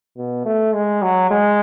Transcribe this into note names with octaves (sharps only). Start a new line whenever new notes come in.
B2
A3
G#3
F#3
G#3